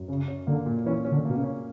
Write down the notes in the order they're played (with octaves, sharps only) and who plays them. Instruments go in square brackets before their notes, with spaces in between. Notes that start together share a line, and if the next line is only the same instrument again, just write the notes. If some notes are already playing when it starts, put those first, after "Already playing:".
Already playing: [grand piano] F#2
[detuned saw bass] C#3 [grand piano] C#4
[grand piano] C#4
[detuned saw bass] D3 [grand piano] A#3
[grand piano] A#2
[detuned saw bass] E3 [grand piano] C#4
[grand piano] C#4
[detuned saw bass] D3
[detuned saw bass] B2 [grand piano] A#3
[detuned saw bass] C#3
[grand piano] C#4